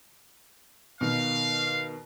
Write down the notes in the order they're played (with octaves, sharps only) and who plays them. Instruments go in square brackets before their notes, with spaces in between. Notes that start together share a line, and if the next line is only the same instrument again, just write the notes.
[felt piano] B2 D#3 [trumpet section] F5